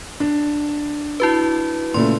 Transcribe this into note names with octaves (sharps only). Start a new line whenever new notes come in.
D4
E4 F#4 B4
A#2 C#3 A3 C6